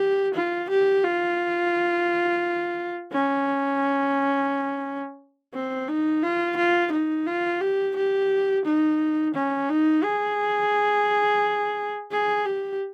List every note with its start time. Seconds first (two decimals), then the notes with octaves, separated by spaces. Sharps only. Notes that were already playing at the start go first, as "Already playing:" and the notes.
Already playing: G4
0.35 F4
0.70 G4
1.04 F4
3.12 C#4
5.54 C4
5.88 D#4
6.23 F4
6.57 F4
6.93 D#4
7.27 F4
7.61 G4
7.96 G4
8.65 D#4
9.35 C#4
9.69 D#4
10.04 G#4
12.11 G#4
12.45 G4